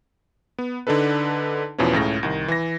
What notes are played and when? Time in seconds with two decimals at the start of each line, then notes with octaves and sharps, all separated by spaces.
0.59 B3
0.87 D3 D4 D#4 A4 B4
1.78 E2 B2 E3 F3 C#4
1.93 C#2 A2 C#3 A#6
2.23 C2 D#3
2.48 E3 A#6